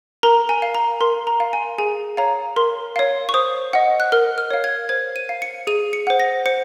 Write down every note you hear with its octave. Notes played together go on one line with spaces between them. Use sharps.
A#4 A#5
G#5
F5
A#5
A#4 C6
A#5
F5
G#5
G#4 G#5
C#5 F5 A#5
A#4 C6
C#5 F5
C#6
C5 D#6
D#5 F#5
F#6
A#4 F6
F6
C#5 F5
G#6
C5 G#6
D#7
F5
C#7
G#4 D#7
C#7
C5 F#5
A#6
C5 C#7